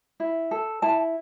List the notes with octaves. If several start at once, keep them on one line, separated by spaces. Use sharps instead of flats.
E4
A4
E4 A5